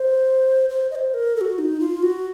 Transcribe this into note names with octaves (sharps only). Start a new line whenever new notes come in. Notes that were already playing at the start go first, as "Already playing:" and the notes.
Already playing: C5
C5
D#5
C5
A#4
A4
F#4
D#4
F4
F#4